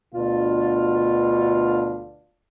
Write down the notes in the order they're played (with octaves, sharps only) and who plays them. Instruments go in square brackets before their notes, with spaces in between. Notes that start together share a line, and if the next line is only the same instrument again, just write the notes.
[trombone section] D2 B2 D4 F4